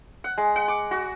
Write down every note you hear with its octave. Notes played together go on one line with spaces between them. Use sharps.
F#5
G#3
F#5
D6
F#4